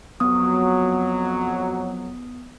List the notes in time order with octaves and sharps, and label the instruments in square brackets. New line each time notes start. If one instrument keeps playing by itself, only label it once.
[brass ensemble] F2 F#3 [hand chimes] B3 D#6